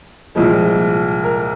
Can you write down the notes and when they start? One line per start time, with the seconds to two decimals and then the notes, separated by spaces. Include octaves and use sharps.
0.35 C2 A#2 F3 G#3
1.24 A#4